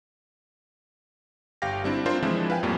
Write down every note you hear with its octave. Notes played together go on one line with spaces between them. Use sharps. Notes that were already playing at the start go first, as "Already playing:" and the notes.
G1 G4 F5 G5 A#6
G3 C4 D4 E4
C4 D4 F4 A#4 C5
E3 F3 G#3 C4 D4 E4
B4 F5 G5 G#5
F2 A2 G3 A#3